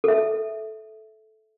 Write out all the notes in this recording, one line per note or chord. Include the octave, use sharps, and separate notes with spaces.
A4 E5